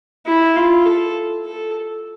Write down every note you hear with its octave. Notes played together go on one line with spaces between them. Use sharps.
E4
F4
A4
A4